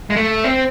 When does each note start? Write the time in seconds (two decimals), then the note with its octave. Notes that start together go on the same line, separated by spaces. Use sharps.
0.10 G#3
0.16 A3
0.44 C4